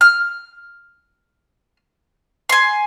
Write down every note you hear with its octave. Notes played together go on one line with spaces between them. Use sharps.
F6
G#5 C6